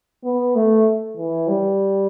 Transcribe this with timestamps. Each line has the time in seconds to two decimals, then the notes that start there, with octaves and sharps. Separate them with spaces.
0.24 B3
0.55 A3
1.16 E3
1.48 G3